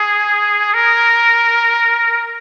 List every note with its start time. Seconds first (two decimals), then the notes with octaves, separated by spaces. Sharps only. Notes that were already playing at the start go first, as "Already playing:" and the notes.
Already playing: G#4
0.74 A#4